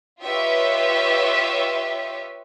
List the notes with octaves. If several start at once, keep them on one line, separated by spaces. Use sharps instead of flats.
F4 G4 B4 C#5 D#5 E5